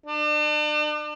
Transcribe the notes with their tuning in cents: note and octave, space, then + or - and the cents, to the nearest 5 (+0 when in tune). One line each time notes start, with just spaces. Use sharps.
D4 +40